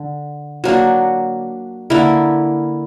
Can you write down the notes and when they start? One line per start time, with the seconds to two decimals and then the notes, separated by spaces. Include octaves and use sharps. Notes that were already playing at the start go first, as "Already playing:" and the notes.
Already playing: D3
0.64 F#3 A#3 D4 F#4
1.90 D3 A#3 E4 A#4